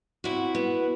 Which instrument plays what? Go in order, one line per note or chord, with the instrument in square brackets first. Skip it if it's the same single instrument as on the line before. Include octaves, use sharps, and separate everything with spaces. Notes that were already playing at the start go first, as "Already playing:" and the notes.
[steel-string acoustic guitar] C3 E4 F#4
B3